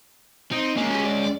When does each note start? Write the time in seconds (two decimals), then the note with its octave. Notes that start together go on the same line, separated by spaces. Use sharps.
0.51 C4 D#4
0.77 G#3 A#3 C#4
0.90 G4 G#4
1.06 D5